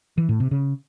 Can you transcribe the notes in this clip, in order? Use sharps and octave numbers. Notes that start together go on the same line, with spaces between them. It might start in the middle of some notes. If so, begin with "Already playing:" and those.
E3
A2
C3
C#3